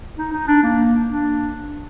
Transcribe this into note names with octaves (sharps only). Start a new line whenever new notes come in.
D#4
D#4
D4
A#3
D4